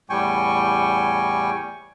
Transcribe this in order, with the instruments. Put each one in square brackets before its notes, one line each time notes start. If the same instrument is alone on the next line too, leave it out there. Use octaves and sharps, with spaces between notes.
[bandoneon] E2 A2 G3 G5 G#5 C#6